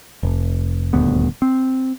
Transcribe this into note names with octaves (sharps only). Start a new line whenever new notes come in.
F1
D#1 D2 G2 B3
C4